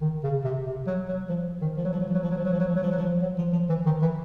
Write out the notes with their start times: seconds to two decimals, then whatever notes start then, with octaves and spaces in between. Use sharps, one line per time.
0.01 D#3
0.24 C#3
0.44 C3
0.66 C3
0.87 F#3
1.08 F#3
1.29 F3
1.62 D#3
1.77 F3
1.85 F#3
1.93 F3
2.00 F#3
2.08 F3
2.15 F#3
2.24 F3
2.31 F#3
2.38 F3
2.45 F#3
2.53 F3
2.60 F#3
2.68 F3
2.75 F#3
2.83 F3
2.91 F#3
2.98 F3
3.22 F#3
3.38 F3
3.53 F3
3.69 E3
3.86 D#3
4.02 E3